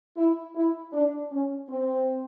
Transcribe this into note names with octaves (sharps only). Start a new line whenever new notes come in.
E4
E4
D4
C#4
C4